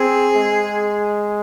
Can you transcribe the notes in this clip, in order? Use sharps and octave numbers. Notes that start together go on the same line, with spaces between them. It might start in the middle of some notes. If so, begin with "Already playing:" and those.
Already playing: C4 G#4
G#3